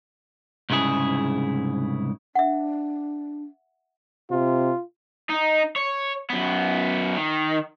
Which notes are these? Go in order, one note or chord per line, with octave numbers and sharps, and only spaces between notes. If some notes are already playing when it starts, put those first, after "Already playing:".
C2 G#2 C#3 E4 G#4
D4 E5 F#5
C3 F4
D#4
C#5
F#2 B3
D#3